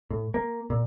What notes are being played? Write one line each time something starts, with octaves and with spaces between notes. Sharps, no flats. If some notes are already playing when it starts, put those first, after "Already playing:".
A2
A#3
A#2